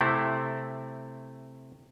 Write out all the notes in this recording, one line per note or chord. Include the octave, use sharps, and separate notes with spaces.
C3 A3 C4 E4